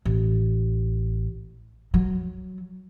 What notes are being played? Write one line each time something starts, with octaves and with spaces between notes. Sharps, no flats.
A1
F#3